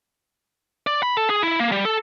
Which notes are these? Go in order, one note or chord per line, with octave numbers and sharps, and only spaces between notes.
D5
B5
A4
G#4
E4
A#3
G3
A4